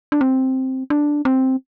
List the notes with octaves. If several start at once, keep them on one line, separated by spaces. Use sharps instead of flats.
D4
C4
D4
C4